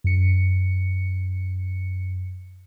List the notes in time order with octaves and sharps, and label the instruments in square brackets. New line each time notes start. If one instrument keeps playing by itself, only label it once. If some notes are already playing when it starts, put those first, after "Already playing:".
[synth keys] F#2 C#7